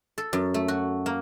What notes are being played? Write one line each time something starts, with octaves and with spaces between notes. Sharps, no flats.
A4
F#2
A3
F#4
A#3